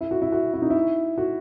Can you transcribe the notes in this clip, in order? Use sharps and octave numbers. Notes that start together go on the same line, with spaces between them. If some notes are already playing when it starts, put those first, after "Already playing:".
E4
F#4
E4
F#4
E4
D#4
E4
F#4